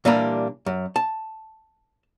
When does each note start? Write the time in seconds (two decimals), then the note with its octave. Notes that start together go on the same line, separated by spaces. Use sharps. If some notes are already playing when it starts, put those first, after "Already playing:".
0.05 A#2 E3 G3 A#3 D4 A#5
0.66 F#2
0.96 A5